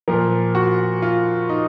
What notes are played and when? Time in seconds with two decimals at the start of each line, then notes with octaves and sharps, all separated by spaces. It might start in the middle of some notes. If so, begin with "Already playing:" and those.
0.08 A#2 F3 A#4
0.55 F#4
1.02 F4
1.49 D#4